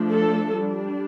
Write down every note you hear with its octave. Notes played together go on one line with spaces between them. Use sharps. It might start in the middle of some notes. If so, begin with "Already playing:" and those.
Already playing: F3 A3 D4
A4
G3 D4